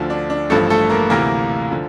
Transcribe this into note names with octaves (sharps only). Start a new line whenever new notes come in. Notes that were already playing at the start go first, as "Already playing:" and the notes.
Already playing: D2 D3 F3
D4
D4
A1 G2 F3 A3 A4
A3 A4
A#3 A#4
D2 C3 E3 A#3 A#4
D3 F3